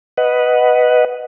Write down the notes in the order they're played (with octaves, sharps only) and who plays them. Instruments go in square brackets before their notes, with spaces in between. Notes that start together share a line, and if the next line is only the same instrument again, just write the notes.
[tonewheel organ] B4 D#5 F#5